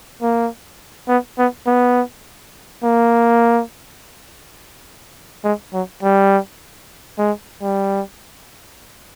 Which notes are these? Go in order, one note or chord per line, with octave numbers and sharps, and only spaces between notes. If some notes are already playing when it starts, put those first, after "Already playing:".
A#3
B3
B3
B3
A#3
G#3
F#3
G3
G#3
G3